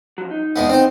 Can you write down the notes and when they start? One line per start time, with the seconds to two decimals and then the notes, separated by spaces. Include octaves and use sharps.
0.18 F2 F#3
0.31 D#4
0.56 E2 G#3 B3
0.69 C4 D#4 C5